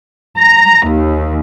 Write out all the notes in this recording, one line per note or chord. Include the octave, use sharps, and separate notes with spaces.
A#5
D#2